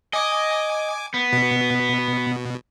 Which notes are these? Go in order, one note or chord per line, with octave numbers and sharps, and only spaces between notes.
D#5 G#5 D6
B3
B2